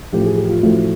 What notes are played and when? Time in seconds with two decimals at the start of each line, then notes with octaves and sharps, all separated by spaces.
0.12 A1 A2 F3 A3 G4
0.26 G#4
0.37 G4
0.49 F4
0.63 A1 A2 F3 A3 F#4